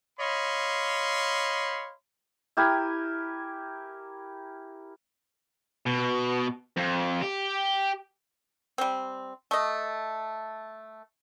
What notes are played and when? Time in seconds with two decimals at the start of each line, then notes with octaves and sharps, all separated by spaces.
0.19 C#5 D#5 F5 B5 C6
2.57 E4 G4 A#4 G#5
5.86 B2
6.77 F2
7.22 G4
8.78 G3 C4
9.51 A3 D#5